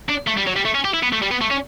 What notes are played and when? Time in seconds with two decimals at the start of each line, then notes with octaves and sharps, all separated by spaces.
0.09 D4
0.27 A3
0.37 G3
0.47 F#3
0.56 G3
0.65 A3
0.75 C#4
0.85 G4
0.94 E4
1.03 B3
1.13 A3
1.22 G3
1.31 B3
1.41 A3
1.50 C#4